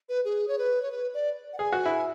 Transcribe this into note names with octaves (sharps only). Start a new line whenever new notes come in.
B4
G#4
C#5
B4
C#5
B4
D5
F#5
G#4 G#5
F#4
E4